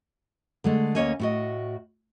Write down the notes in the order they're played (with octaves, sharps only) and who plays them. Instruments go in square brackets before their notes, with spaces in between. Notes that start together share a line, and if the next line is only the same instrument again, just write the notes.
[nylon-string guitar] D3 G#3 A3
D2 A#3 C#4 C#5 D#5 G#5
A2 F#4 D#5